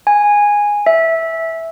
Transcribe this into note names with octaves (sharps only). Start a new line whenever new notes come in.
G#5
E5